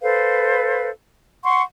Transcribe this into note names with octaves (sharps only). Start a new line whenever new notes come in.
A4 B4 C5 F5
F#5 C6 C#6